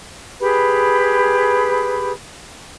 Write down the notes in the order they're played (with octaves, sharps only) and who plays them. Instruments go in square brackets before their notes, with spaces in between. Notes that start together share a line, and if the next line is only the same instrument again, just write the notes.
[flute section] G4 G#4 B4 B5